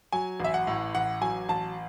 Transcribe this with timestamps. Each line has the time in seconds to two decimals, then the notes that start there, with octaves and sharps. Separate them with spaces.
0.13 F#3 G#5
0.40 A1 E5
0.54 F#5
0.67 A2
0.95 A1 F#5
1.21 F#3 G#5
1.49 A1 A5